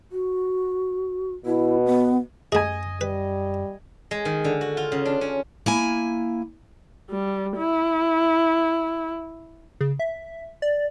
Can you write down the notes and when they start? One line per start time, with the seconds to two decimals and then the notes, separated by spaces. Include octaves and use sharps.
0.12 F#4
1.46 B2 E4
1.86 B3
2.52 F#2 A3 G#4 D#5 G#5
3.01 G3 B4
4.11 G#3
4.25 D#3
4.45 D3
4.61 F#4
4.77 F4
4.92 C#3
5.05 D4
5.21 C#4
5.66 A#3 E4 G#5
7.10 G3
7.57 E4
9.81 C#3
9.99 E5
10.62 D5